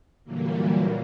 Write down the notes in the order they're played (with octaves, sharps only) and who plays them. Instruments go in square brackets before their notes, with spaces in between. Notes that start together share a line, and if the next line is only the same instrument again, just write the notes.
[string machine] A#2 D3 E3 F#3 G3 A#3